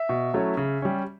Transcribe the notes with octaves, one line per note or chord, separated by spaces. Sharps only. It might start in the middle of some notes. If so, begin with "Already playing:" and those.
Already playing: E5
B2
F#3 A3 C#4 E4
C#3
G3 C#4